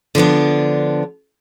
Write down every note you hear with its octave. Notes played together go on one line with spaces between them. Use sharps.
D3 F3 B3 D4